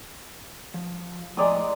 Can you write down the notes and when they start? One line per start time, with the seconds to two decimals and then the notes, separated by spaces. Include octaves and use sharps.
0.74 F3
1.37 A2 F3 G#3 D5 A#5 D#6